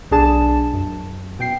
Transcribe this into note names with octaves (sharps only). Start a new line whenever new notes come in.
B1 D4 G#4 A5 E7
F#2
B2 G5 C7